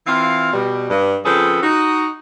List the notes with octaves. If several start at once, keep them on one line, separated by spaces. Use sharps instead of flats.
E3 C4 F4 E5 F5
B2 G3
G2
C#3 F3 C4 G#4 A4 B4
D#4 F#4